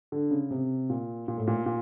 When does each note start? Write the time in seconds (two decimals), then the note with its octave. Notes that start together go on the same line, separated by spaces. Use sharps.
0.12 D3
0.31 C#3
0.51 C3
0.90 A#2
1.28 A#2
1.38 A2
1.47 A#2
1.66 A#2